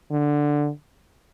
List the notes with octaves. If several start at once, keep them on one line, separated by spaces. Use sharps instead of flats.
D3